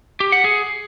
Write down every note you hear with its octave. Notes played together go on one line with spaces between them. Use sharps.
G4
F#5
G#4